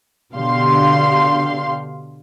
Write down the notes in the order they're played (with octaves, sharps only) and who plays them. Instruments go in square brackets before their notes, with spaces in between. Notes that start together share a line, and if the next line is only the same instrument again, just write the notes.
[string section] B2 D3 G4 F5 C6